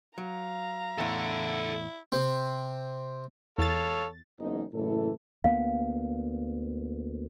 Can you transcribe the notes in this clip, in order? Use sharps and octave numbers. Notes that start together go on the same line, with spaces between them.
F#3 F5 A#5
E2 A2 E4 A4 F#5
C3 C4
E2 A4 C#5 F5 A6
F#1 E2 G#2 D#4
F#1 A2 E3 A4
D2 A#3 B3 F5